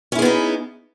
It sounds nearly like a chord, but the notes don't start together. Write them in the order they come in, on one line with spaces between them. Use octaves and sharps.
C#4 E4 G#4 B3 D#4